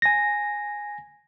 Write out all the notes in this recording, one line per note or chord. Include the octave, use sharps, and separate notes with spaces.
G#5 A#6